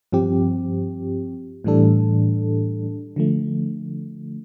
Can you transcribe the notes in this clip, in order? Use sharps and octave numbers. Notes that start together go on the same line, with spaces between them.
G2 F3 C4 G4
A2 E3 G3 D4 A4
D3 F3 A3